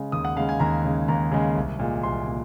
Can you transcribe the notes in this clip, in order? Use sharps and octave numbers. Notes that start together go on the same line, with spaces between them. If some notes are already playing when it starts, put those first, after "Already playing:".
Already playing: C#3 G#3
D#2 D#6
F#5
C#3 G#3 F5
G#5
D#2 A#5
C#3 G#3
D#2 A#5
C#3 G#3
C2
A#2 G#3
C2 C6
A#2